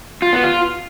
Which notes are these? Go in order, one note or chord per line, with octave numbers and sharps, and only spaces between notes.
F4
B3
F4